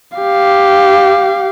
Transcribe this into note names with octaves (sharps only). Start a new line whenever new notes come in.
G4 F5